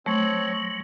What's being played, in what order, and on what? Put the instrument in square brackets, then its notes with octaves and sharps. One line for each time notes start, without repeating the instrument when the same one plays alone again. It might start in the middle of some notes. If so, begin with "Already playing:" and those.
[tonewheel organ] F#3 [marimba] A3 [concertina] C4 C#5